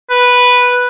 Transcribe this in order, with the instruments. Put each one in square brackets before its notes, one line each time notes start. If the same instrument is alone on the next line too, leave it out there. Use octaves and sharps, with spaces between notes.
[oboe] B4